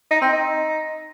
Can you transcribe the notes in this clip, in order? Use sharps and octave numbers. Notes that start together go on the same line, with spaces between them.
D#4
C4
D#4